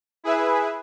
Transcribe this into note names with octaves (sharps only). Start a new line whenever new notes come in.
E4 G#4 B4 E5